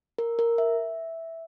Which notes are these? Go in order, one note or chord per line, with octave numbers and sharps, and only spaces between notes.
A#4
A#4
E5